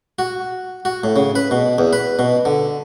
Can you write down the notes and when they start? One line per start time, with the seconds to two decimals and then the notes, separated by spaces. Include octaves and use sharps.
0.19 F#4
0.85 F#4
1.04 A2
1.16 C#3
1.35 B4
1.51 B2
1.78 E2
1.93 B4
2.19 B2
2.45 D3